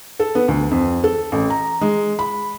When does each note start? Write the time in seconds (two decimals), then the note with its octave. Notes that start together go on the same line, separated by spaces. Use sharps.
0.19 A4
0.35 B3
0.48 D2
0.71 F2
1.04 A4
1.32 A1
1.50 A#5
1.81 G#3
2.19 B5